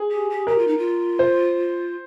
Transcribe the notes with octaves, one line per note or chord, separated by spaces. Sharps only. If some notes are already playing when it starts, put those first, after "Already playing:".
Already playing: G#4
G4
G4
G4 A#4
F4
D#4
F4
C5